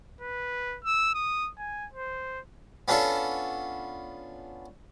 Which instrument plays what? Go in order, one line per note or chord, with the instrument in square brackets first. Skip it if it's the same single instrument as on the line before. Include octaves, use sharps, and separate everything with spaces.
[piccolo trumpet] B4
E6
D#6
G#5
C5
[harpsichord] B3 C#4 D4 F4 A4